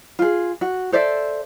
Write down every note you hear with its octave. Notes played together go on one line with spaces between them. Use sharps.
F4 G#4
F#4
A4 C5 D5 E5